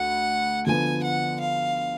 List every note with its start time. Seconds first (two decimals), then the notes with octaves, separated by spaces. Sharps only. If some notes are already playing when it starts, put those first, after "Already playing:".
Already playing: D2 F#5
0.66 D3 F3 B3 G#5
1.03 F#5
1.40 F5